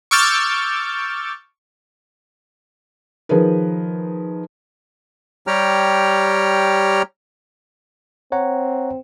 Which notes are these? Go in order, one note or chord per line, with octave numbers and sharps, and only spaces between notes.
C#6 D6 E6 F6 G6 A6
D#3 F3 G#4 A#4 B4
G3 G4 C#5 G5 A#5 F6
C4 C#5 F#5 A#5